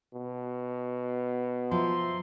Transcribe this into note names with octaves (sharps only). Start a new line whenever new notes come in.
B2
F3 E5 A#5 C6